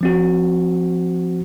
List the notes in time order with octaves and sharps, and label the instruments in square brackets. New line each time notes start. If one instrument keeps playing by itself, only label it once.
[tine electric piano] F3 C4 F#4